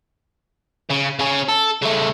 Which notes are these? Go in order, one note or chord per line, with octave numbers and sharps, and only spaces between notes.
C#3
C#3 C#4
A4
C#3 A3